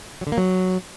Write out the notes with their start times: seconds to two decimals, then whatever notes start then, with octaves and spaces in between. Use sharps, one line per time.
0.21 F#3
0.27 D3
0.32 A#3
0.38 F#3